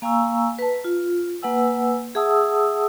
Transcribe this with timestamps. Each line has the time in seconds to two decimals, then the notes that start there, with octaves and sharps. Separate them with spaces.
0.02 A#3 F5 G#5 A#5 C#6 E6
0.59 B4 A5
0.84 F4
1.42 A#3 B4 F#5 G#5 E6
2.15 G#4 E5 F#5 A5 D#6 E6